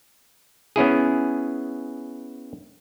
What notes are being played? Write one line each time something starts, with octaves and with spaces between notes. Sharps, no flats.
B3 C#4 E4 G#4